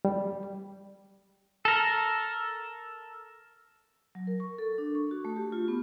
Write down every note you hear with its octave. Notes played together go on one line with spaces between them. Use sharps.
G3
A4 A#4
F#3
A#4
C#6
A4
D4
C#6
F#4
A3
G4
F4
B3